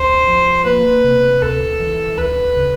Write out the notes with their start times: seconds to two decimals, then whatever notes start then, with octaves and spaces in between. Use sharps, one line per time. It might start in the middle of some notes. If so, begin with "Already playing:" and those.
Already playing: D2 C5
0.27 F3
0.66 A#3 B4
1.04 C3
1.42 D2 A4
1.80 E3
2.18 D2 B4
2.56 C#3